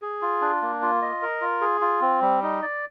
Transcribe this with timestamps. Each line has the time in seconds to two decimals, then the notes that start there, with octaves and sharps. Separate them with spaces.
0.02 G#4
0.22 F4
0.41 D4
0.62 A#3
0.82 F4
1.02 D#5
1.22 A#4
1.41 F4
1.61 G#4
1.81 F4
2.01 C4
2.22 G3
2.42 D#4
2.62 D5